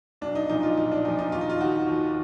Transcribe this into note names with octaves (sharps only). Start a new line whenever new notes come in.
B1 D4
D#4
A#2 F3 D#4
F4
B1 D#4
D4
A#2 F3 D#4
D#4
D#2 F4
D#4
F4
D#3 F#4
D#2